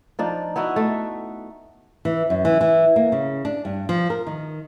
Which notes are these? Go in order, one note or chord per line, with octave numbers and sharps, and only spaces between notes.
F3 D4 D#4
B3 D#4 E4 F#4
A3
E3
F#2
E3
E3
A#3
C#3
D4
G2
F3
A#4
D#3